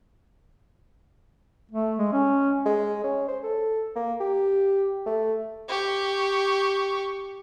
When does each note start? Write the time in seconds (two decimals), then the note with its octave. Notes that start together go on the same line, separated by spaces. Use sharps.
1.72 A3
1.99 G#3
2.13 C#4
2.65 G#3
3.04 C#4
3.28 C5
3.43 A4
3.96 A#3
4.20 G4
5.06 A3
5.68 G4 C#6